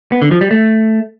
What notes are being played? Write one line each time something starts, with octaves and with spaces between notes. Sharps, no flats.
B3
D3
F3
G3
A3